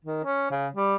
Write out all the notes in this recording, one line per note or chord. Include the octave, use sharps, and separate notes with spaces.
D#3
C#4
C#3
G3